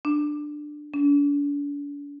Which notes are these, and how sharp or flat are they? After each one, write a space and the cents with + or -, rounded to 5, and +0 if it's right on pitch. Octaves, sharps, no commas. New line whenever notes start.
D4 +15
D4 -40